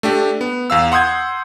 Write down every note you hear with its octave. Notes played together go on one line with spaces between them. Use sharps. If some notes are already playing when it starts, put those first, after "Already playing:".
A3 D4 G4
B3
E2 F5 E6
F#5 C6 D#6 G6 G#6